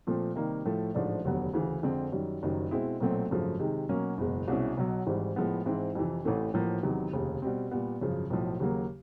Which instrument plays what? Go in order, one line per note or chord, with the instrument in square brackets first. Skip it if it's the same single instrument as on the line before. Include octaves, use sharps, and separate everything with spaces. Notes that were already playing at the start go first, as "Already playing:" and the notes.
[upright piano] A#2 F3 A3 C4
C3 D#3 G3 A#3
A2 F3 A3
A1 G#2 F3 A3 D4
F1 D#2 D3 F#3 B3
D2 C#3 E3
F2 D3 F3 G#3 C4
F#2 D#3 G3
F#1 F#2 D#3 G3
B2 G#3 C4 E4
B1 A#2 F#3 A3 C4
G#1 F#2 C#3 F3 A3
C3 D#3 G#3
B2 F#3 A#3 C#4
F#1 E2 B2 G#3
C2 B2 G#3 C#4 E4
B1 B2 F#3
G#1 G#2 E3 G3
A2 F3 G#3 B3
G#2 E3 G#3 C4 E4
F2 C3 E3
A1 A2 E3 A3 C4
A1 A2 F3 A#3
E2 C3 D#3 F#3 B3
F1 D#2 C#3
B2 G3 C4
A#2 G3 B3
G#1 F#2 C#3 F3
B1 A2 F3
D#2 C#3 F#3 A#3